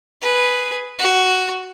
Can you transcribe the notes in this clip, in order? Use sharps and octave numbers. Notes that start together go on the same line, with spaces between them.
G#4 B4
F#4